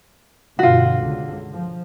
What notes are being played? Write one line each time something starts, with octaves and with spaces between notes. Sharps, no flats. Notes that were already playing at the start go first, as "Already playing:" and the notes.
G2 B2 D3 F4 F#4
C#2 D3
F3